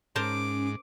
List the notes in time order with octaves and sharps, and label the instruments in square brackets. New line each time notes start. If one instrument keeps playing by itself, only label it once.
[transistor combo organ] G#2 [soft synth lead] C#4 [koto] A#4 C5 A5 [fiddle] D6